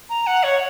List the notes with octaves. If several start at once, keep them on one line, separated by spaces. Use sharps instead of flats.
A#5
F#5
C#5